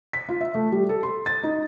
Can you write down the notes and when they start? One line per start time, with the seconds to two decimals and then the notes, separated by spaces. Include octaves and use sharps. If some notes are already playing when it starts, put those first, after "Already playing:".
0.13 B6
0.29 F4
0.41 E5
0.55 A3
0.72 G3
0.89 A4
1.03 C6
1.26 A6
1.43 D#4